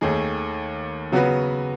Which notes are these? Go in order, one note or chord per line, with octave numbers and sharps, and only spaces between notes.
D#2 D#3 A3 D#4 G#4
C#3 F#3 B3 F#4 B4